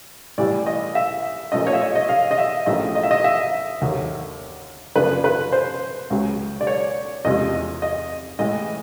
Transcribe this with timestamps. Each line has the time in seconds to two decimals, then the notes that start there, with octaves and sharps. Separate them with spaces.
0.38 A2 E3 G3 D5
0.66 D#5
0.95 E5
1.52 A#2 F3 A3 C#4 D#5
1.67 C#5
1.73 E5
1.81 D#5
1.95 D#5
2.09 F5
2.31 D#5
2.38 E5
2.66 A#1 A2 F3 A3 C#4 D#5
2.95 D#5
3.03 E5
3.11 D#5
3.24 E5
3.81 D#2 D3 F#3
4.95 F#2 C#3 F3 A#3 D4 B4
5.24 B4
5.52 C5
6.10 C#2 C#3 F#3
6.61 D5
6.67 C#5
7.25 E2 C3 F3 G#3 C#4 D#5
7.82 D#5
8.39 A2 E3 G#3 D#5